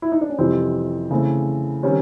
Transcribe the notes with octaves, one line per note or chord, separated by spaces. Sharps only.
E4
D#4
D4
C#4
F2 C3 E3 G3 C4
C#3 E3 A3 C4
D#3 G3 C4 C#4